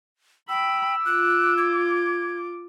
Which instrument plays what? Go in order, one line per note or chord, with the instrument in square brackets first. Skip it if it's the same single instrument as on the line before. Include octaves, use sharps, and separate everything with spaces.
[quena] G5 [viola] B5 [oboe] E6
[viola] F4 D6 [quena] F#6
[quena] G#6